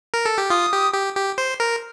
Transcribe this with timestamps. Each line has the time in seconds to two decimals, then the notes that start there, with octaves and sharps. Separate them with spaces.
0.14 A#4
0.25 A4
0.38 G4
0.50 F4 D#6
0.72 G4
0.93 G4
1.16 G4
1.38 C5
1.60 A#4